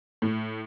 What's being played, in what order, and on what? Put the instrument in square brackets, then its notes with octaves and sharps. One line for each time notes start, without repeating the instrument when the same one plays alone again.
[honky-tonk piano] A2